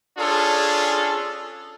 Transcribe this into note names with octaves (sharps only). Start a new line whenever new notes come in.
C#4 D4 F4 G#4 A4